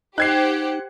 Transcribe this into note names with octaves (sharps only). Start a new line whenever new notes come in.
D#4 G4 C5 F#5 F#6 G#6 C7